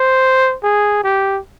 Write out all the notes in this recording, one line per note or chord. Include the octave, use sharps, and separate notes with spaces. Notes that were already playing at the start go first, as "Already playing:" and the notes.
Already playing: C5
G#4
G4